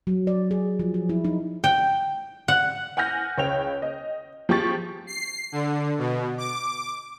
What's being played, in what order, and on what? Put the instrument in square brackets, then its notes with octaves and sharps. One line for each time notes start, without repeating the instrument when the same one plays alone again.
[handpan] F#3
D5
G#4
F3
G#4
E4
D#4
[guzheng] G5
F#5
[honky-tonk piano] F#5 G#5 F6 G6 A#6
C#2 C#5 G5 F7
D#5
F3 G4 G#4 C#6 A6
[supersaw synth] C7
D3
B2
D6